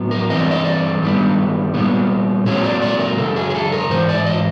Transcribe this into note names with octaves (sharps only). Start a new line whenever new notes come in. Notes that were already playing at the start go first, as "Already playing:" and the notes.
Already playing: A2 F#3 B3
A#4
G2 E3 A3 C4 D#5
D5
D#5
D5
G2 D#3 G3 B3
A#2 G3 B3
A#2 F#3 A3 C4 C#5
D5
D5
A#4
F#2 C#3 A4
G#4
G#4
A4
A#4
G#2 E3 C5
D5
D#5